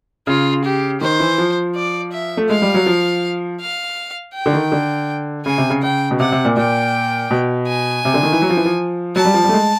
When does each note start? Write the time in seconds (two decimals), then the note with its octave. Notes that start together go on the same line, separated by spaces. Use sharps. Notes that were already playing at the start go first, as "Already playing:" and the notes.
0.27 C#3 F4
0.65 G4
1.01 D#3 C5
1.20 E3
1.38 F3
1.75 D5
2.12 E5
2.37 A3
2.49 G#3 F5
2.62 G3
2.74 F#3
2.86 F3
3.61 F5
4.34 G5
4.46 D3
4.53 D#3
4.72 D3
5.46 C#3 G#5
5.58 C3
5.70 C#3
5.82 C#3 G5
6.11 B2
6.20 C3 F#5
6.32 C3
6.45 A#2
6.57 A#2 G5
7.31 B2
7.68 G#5
8.05 C3
8.14 D3
8.23 D#3
8.32 E3
8.42 F#3
8.50 F3
8.57 E3
8.65 F3
9.16 F#3 A5
9.25 G3
9.34 F3
9.44 G3
9.49 A3
9.53 G#3